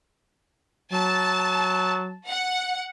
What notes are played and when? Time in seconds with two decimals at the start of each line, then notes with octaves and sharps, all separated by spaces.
0.92 F#3 A5
2.25 F#5